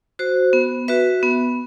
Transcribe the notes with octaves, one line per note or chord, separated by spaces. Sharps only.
F#4 C5
B3
F#4 B4 E5
B3